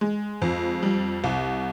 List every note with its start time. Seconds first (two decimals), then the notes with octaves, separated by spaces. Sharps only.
0.01 G#3
0.42 F2
0.83 G3
1.24 C2